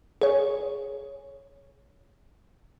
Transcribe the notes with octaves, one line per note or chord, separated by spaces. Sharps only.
G#4 C#5